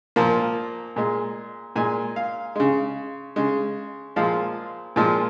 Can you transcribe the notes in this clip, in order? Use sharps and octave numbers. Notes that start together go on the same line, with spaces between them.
A#2 F3 A#3
A#2 G#3
A#2 G#3 G#5
F5
C#3 G#3
C#3 G#3
A#2 F3 G#3 F5
A#2 F3 G#3